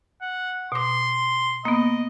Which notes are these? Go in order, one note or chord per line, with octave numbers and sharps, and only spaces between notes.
F#5
B2 C6 D6
A#3 B3 D#5